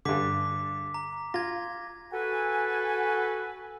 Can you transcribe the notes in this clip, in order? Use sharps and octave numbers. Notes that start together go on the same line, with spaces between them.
G2 D3 D6 B6
A#5
F4 G#6 A#6
F#4 A4 B4 G#5